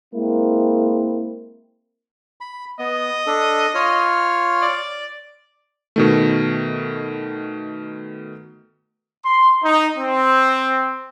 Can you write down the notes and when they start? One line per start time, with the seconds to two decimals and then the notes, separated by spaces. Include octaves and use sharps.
0.13 G#3 A#3 C4 E4
2.41 B5
2.79 B3 D#5
3.27 D4 A4
3.75 F4 C#5 F6
4.62 D5
5.96 B2 D#3 A3
9.24 C6
9.62 D#4
9.97 C4